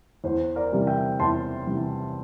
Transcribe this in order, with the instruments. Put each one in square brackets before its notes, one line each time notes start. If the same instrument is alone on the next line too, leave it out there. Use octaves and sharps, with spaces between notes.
[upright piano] E2 C5
A#4 D5
C3 E3 G3
E5 G5
E2 A5 C6
C3 E3 G3